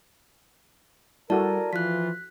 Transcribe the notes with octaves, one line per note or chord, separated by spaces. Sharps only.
G3 E4 F#4 A4 A#4 D5 A5
E3 F3 F4 F#6 B6